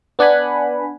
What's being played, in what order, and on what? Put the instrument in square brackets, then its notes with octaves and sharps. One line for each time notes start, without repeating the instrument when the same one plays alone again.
[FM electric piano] B3 D4 F#5 G#5 B5